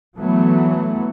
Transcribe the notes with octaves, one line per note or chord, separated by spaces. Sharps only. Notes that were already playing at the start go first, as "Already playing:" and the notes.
E3 F#3 A3 B3